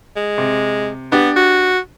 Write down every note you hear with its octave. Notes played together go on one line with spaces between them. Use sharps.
G#3
C3
B3 D4 G4
F#4